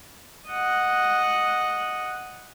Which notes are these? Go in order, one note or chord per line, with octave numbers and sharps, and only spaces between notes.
D#5 F#5